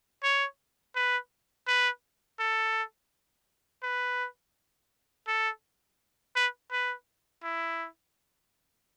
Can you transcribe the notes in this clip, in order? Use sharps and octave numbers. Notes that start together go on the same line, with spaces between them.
C#5
B4
B4
A4
B4
A4
B4
B4
E4